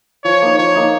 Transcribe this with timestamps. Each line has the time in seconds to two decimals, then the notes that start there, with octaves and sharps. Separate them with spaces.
0.24 F3 C#5
0.42 A#3 D#4
0.58 F3 C#5
0.76 A#3 D#4